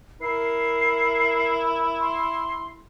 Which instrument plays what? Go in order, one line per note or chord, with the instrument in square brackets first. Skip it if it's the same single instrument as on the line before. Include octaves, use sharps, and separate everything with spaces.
[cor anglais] E4 [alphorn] A#4 [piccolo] C7
[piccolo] C6